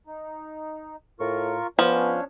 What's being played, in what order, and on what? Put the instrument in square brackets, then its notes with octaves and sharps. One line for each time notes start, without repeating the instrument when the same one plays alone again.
[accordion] D#4
[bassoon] A2 [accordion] F4 A#4 C#6
[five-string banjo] F3 [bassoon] B3 [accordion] C#4 D4 C#5